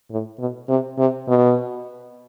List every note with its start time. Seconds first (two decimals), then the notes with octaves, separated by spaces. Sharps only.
0.11 A2
0.39 B2
0.69 C3
0.98 C3
1.28 B2